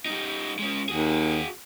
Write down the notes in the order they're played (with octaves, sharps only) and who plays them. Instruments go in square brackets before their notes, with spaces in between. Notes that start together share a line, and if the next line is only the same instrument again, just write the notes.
[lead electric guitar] G3 D#4
G#3 C#4
[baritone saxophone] D#2 [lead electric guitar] F#4 G#4